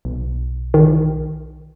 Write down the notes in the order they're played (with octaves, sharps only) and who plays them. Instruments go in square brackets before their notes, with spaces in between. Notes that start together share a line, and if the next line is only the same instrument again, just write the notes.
[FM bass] B1
[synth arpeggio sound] D#3